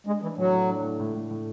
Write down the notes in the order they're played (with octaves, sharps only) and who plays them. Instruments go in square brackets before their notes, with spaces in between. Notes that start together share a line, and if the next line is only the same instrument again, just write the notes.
[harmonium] G#3 [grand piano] D4
[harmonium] E3 [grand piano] D4
[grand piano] A2 [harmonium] F#3
[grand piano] A2
D4
A2
A2
A2
A2